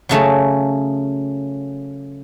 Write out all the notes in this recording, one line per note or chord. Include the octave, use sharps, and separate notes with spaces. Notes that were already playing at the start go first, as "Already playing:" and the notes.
C#3 F#3 A3 C#4 A5